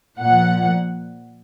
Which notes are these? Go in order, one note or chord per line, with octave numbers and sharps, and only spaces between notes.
A#2 F3 F#5